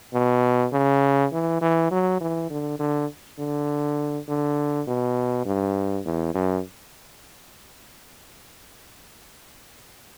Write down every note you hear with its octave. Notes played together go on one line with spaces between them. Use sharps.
B2
C#3
E3
E3
F#3
E3
D3
D3
D3
D3
B2
G2
E2
F#2